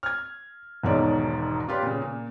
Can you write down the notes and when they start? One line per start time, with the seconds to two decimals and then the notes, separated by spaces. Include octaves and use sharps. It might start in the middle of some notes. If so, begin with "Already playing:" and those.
0.03 F6 G#6
0.83 E1 B1 G#2 D#3 C#5 D5
1.68 C#4 F4 G4 B4 D5
1.82 A#2 C#3
2.02 A#2